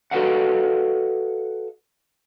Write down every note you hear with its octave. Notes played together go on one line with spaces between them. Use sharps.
F#4 A4 B4 D#5 F5 F#5